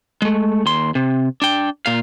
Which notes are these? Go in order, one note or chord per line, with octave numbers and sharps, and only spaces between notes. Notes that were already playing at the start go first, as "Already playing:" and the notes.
G#3 A3
D#2 C6
C3
D4 G5
A#2 F5